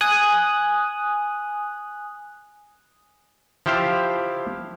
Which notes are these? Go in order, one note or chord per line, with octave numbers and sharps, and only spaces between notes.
G#5 D#6 F#6
F3 E4 G4 C5 F5